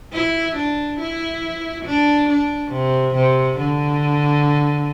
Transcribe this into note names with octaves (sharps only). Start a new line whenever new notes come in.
E4
D4
E4
D4
D4
C3
C3
D3